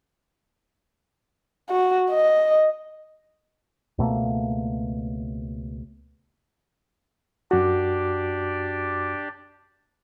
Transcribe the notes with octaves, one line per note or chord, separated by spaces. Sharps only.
F#4
D#5
C#2 B2 A3 A#3
F#2 D4 F#4 G4 D5